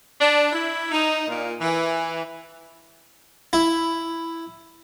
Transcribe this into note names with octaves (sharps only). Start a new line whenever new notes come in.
D4
E4
D#4
A#2
E3
E4